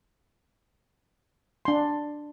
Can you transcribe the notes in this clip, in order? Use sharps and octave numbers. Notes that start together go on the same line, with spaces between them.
D4 C6